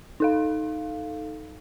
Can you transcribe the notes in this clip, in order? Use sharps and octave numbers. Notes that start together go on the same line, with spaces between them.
D#4 A4 F5